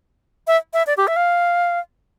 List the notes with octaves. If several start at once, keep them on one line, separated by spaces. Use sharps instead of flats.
E5
E5
D5
G4
E5
F5